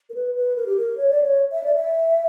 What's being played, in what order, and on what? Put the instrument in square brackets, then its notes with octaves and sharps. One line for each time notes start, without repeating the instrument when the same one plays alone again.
[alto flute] A#4
B4
B4
A#4
G4
A#4
C#5
D5
C#5
E5
D5
E5